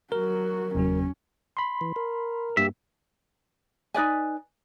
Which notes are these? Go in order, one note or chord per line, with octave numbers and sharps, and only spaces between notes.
F#3 F#4 A#4
F#1 E2 F#3 C#4
B5 C6
E3
A#4
G2 A#3 G4 E5
D#4 B4 D5 G#5